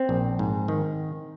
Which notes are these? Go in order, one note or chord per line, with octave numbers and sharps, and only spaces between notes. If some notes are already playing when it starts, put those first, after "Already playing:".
Already playing: C4
A#1
G#2
D#3